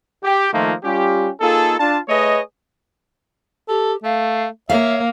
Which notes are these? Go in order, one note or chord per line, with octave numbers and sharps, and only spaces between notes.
G4
D#3 F3 A3 A#3 D#4 F4
G3 C#4 F4 G4
A#3 D#4 F4 G#4 A4
D4 F4 A5
A3 G#4 B4 C#5 D#5
G4 A4
A3 F5
A#3 C#5 E5 F5